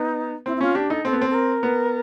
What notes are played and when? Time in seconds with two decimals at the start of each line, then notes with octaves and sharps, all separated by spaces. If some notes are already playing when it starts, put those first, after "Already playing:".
Already playing: B3 D#4
0.46 C4 E4
0.56 E4
0.61 C#4 F4
0.75 D4 G4
0.90 D#4 A4
1.05 C4 A4
1.13 B3
1.22 C4
1.30 A4
1.34 A#4
1.63 B3